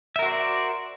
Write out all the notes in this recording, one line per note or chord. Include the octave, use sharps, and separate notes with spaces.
F#4 A#4 C5 D5 E5